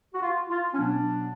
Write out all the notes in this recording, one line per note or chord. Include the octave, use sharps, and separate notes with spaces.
F#4
F4
F4
C#4
B2 F#3 B3 D4